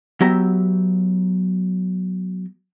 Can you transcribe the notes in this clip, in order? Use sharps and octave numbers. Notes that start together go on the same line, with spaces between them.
F#3 B3 G4 E5 A#5